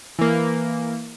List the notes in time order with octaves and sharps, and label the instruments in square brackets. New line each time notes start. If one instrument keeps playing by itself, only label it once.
[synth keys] E3 A#3